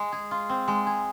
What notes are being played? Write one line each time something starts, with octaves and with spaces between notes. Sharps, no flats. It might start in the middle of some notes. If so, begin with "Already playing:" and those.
Already playing: G#3
G#4
F4
C4
G#3
G#4